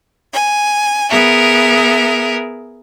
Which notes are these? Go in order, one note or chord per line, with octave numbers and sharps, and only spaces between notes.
G#5
B3 G#4 A#4 E5